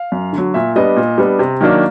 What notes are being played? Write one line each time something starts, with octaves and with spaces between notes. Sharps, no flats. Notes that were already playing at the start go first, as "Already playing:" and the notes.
Already playing: F5
F#2
D3
F#3
A#2 E5
G3 B3 D4 D#5
A#2
G3 B3 D4
C3
D#3 F#3 A#3 D4